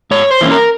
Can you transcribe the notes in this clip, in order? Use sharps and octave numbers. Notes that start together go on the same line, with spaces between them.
G#2 C#5
C5
E3 A#3 C#4
A#4